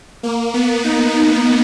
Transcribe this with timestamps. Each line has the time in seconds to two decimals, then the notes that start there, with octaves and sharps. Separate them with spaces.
0.23 A#3
0.54 B3
0.84 D#4
1.14 D#4